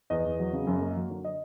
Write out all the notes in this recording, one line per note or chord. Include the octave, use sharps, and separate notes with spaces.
E2 D#5
E2
F#3
C#3
F#2
A#3
F#3
D3
D#5